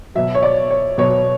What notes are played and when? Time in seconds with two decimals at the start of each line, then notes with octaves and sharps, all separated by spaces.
0.15 B2 F#3 E5
0.35 C#5
0.43 D5
0.70 C#5
0.98 B2 F#3 C#5